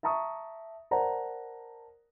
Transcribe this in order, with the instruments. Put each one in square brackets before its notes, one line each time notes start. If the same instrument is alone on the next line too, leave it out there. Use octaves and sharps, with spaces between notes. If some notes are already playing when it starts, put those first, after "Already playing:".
[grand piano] E5 A5 A#5 C#6 D#6
A#4 C5 D5 F#5 A5 A#5